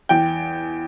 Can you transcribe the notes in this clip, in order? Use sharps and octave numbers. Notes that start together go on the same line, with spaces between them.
E2 G5